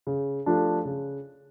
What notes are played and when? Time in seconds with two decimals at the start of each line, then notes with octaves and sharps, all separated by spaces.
0.07 C#3
0.46 F3 A3 D4 G4
0.85 C#3